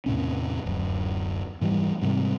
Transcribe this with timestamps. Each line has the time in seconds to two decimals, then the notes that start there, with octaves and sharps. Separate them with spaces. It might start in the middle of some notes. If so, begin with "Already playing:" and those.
0.06 E2 A2 C3 C#4
0.66 D1 F#2
1.61 G#2 E3 F#3 G3
2.02 G#2 C3 G3